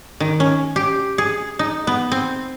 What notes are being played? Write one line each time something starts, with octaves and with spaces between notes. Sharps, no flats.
D#3
C#4
G4
G#4
D#4
B3
C4